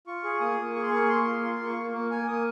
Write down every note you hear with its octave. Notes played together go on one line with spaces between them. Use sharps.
F4 C#6
G#4
A#3 D#6
A#3
G#4 C#6
C6
A#3 C#6
A#3 C6
F4
F4 C6
C6
A#3
C#6
A#3
A#3
A#3 G#5
A#3 D#6